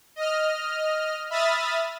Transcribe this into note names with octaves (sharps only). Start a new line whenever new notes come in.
D#5 F6
E5 B5 D#6 F6 A6